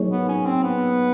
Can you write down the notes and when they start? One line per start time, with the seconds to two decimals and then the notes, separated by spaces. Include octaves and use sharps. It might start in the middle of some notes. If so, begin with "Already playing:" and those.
Already playing: F#3 A#3 D#4 G#4 C#5
0.11 B3
0.29 C#4
0.46 C4
0.63 B3